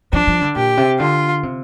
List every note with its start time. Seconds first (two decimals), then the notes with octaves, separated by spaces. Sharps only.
0.12 F3 D4
0.27 F3
0.41 D3
0.56 A#2 G4
0.77 C3
1.00 D3 F4
1.43 C3